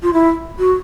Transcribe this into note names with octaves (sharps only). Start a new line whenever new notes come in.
F4
E4
F#4